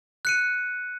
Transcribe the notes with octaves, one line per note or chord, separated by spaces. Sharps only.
F#6 C#7 D#7